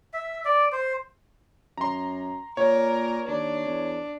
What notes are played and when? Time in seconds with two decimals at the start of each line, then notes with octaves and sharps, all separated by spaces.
0.14 E5
0.45 D5
0.72 C5
1.78 F#2 A#5 C6
2.57 A#2 A#4 C#5
3.28 D#2 D4
3.66 E2